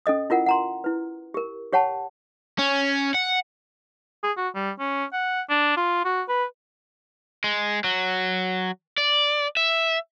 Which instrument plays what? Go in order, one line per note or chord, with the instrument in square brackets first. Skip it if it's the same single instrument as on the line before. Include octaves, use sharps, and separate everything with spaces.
[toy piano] C#4 A4 D#5 D#6
E4 F4 A#4 F#5
F#5 A#5 C6
E4 B4
G4 A#4
G4 C#5 F#5 G5 A5 B5
[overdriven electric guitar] C#4
F#5
[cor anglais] G#4
F#4
G3
C#4
F#5
D4
F4
F#4
B4
[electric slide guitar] G#3
F#3
D5
E5